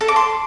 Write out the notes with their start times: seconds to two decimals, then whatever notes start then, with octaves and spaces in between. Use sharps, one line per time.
0.01 A4
0.08 D6
0.16 C6